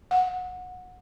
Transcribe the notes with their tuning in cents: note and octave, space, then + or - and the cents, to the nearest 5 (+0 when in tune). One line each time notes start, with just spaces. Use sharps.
F#5 -20